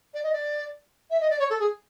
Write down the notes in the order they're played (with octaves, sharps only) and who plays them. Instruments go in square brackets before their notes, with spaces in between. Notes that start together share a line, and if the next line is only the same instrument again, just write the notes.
[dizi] D5
D#5
D5
E5
D#5
D5
C#5
A4
G#4